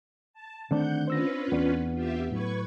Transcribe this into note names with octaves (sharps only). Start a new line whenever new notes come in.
A5
D3 D#3 A3 C4 D4 F#5 G6
C#4 F4 B4 C5 E6 A#6
E2 B3 D5 B5
F4 G4 E5
A2 F#3 B4 C#6 G#6